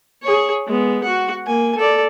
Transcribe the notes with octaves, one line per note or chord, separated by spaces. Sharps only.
G#4 C#5
G#3 B3
F#4 F#5
A#3 G#5
A4 D5